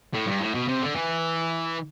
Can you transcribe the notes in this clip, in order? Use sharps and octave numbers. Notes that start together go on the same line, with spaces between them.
A2
G2
A2
B2
C3
D3
E3